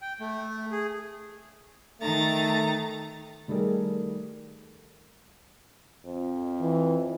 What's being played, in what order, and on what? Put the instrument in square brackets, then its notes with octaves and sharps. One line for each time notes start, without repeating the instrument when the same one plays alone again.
[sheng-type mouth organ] G5
A3
G#4
[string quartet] D#3 A#5 A6 [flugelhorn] A3
[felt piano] D#3 G3 A3 G#4 A#4
[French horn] F2
[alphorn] E3